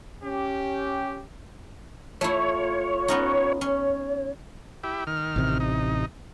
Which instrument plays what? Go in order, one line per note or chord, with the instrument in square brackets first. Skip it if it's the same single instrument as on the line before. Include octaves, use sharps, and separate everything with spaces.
[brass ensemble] C#4 G4
[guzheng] A3 E4 [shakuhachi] F4 [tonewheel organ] C#5
[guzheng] B3 C#4 D#4
[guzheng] C#4 [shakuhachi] C#5
[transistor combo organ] E4 G4
D#3 F6
[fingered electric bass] A1 C3
[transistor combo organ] D#4